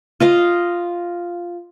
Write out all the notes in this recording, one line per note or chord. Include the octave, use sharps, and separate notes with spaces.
F4 D#5 F5